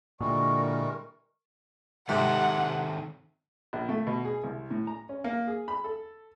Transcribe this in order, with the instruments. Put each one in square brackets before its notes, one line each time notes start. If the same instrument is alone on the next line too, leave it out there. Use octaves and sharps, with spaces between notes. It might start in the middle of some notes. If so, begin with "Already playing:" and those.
[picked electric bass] A#2 [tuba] D3 [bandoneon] E3 G3 G#3 [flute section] A#4 C#6
[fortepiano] G#2 [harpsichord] C3 [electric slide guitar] D#3 C4 A4 [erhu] F#5
[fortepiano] A#1
A3
B2
G#4
C2
A2
A#5
C#4
A#3
G#4
B5
A4